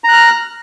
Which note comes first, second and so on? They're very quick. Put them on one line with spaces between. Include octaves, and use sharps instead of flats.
A#5 F#6 F6